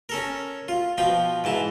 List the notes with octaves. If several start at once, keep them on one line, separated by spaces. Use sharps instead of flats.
C#4 A4 A#4
F4
B2 F3 F4 G5
G#2 E3 A5